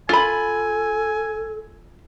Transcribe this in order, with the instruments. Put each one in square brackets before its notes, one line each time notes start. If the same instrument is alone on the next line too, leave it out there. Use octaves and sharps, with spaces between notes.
[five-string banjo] F4 B5 [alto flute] A4 [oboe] G#5